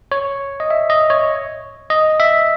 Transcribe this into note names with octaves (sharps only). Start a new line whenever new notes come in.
C#5
D#5
E5
D#5
C#5
D#5
E5